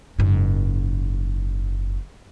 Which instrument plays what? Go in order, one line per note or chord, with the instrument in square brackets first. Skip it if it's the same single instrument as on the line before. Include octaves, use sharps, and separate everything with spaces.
[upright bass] F#1 G#2